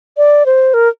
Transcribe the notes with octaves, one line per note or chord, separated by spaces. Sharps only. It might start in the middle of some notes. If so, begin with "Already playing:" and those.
D5
C5
A#4